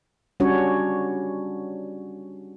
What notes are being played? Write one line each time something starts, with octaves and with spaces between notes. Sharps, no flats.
G3 C#4 D4 F#4 C#5